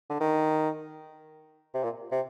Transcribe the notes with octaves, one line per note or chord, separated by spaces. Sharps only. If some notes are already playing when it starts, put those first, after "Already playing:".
D3
D#3
C3
A#2
C3